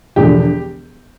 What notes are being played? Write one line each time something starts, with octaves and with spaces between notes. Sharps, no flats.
E1 E2 D3 F3 G4